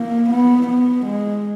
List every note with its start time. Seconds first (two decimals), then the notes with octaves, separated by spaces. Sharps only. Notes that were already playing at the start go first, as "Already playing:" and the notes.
Already playing: A#3
0.30 B3
0.67 B3
1.06 G#3